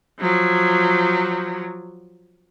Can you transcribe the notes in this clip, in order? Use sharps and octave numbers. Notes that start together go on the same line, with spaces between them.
F3 F#3